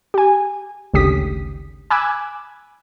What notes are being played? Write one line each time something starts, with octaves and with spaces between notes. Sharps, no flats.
G4 G#5
G#1 D2 C#3 G4 D#6 B6
G#5 B5 D6 E6 F#6 G#6